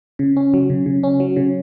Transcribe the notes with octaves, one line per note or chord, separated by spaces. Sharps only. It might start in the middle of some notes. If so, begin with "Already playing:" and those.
C#3
C#4
F#3
C#3
C#3
C#4
F#3
C#3